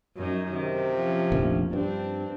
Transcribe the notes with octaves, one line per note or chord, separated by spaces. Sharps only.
F#2 F#3 D#4
C3 D#3
F3 C#4
F1 A#1 D#3
G2 C4 D4